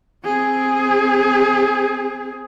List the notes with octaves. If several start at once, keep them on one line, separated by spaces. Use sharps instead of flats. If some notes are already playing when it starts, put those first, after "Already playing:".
C4 G#4